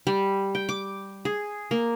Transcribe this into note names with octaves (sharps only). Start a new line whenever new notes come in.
G3
G5
D6
G#4
A#3